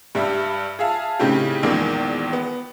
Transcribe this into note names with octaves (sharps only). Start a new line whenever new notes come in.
G2 G3 E5
G#4 E5 F5 A5
A2 C#3 C4 D#4 G4
A#1 E2 D#3 G#3 A#3
B3